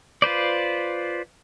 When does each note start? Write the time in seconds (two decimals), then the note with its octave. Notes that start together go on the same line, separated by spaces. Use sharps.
0.22 F4 B4 C5 D5